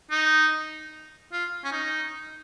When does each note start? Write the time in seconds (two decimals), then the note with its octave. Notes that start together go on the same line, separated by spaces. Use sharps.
0.11 D#4
1.32 F4
1.64 C#4
1.72 D#4